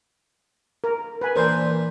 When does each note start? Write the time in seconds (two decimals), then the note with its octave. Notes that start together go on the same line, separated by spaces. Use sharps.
0.84 A#4
1.21 B4 G#5
1.36 A#2 E3 D4 A#4 C5